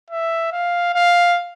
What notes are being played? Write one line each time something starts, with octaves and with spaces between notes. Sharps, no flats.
E5
F5
F5